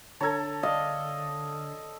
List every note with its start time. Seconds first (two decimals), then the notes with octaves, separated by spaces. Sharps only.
0.21 D3 A4 C#5 A5 A#5 G#6
0.63 D5 D#5 F5